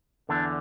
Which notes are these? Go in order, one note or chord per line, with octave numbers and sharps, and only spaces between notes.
E2 D3 D4